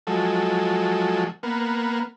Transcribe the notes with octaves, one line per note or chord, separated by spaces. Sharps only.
F3 F#3 G#3 A4
A#3 B3